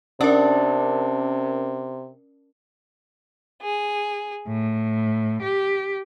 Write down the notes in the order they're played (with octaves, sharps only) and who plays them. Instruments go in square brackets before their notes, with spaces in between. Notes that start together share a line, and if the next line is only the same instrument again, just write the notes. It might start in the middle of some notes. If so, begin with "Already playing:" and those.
[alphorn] C3 [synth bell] C#4 A#4 [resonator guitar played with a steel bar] D4
[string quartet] G#4
A2
G4